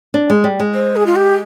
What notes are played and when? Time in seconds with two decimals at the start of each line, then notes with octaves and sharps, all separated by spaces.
0.14 D4
0.30 G#3
0.44 G3
0.60 G#3
0.74 C5
0.96 G#4
1.06 F4
1.16 G4